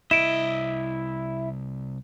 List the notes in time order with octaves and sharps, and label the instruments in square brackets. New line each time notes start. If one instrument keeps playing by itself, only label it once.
[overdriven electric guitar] C2 D#5 [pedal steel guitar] E4 [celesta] D7 E7